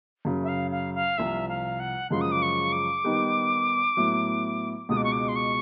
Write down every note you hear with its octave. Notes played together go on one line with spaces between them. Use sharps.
F#2 C#3 F#3
E5
F5
F5
F5
C2 C3 F3 E5
F5
F#5
F#2 C#3 F3 G#3 C6
D#6
D6
C#6
D6
D#3 G3 B3 D#4 G4
A2 F#3 B3 E4
C#2 B2 G#3 D#6
D6
C#6
D6
C6
C#6